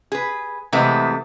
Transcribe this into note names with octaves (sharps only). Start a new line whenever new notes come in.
G#4 B4
C3 E3 G#3 A3 B3 C4